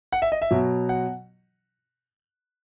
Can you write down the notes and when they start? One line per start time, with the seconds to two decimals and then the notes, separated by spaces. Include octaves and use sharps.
0.12 F#5
0.22 E5
0.32 D#5
0.42 E5
0.51 B2 F#3
0.89 F#5